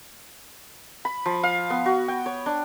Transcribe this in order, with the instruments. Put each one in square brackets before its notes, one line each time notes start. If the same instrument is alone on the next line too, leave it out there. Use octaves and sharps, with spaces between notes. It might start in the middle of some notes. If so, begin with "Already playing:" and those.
[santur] B5
F3
F5
B3
F#4
G5
C#5
D4